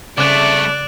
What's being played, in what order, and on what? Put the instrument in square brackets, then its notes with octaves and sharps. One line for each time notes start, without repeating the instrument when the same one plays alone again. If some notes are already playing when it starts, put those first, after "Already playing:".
[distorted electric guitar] C2 A3 [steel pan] C#3 [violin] D5 [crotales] D6 F#6